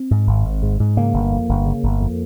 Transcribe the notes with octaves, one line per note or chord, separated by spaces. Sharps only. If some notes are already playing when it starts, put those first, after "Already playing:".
Already playing: C4
G#2
G#1
G#1
G#2
G#2
C#3 A#3
G1
F2
G1
C#3
G1
F2